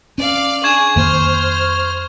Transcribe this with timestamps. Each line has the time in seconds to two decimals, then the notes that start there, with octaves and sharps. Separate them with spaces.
0.18 C#4 D5 F5
0.64 D4 G#4 C#6 G#6 E7
0.96 F2 D#3 A#3 C5 F6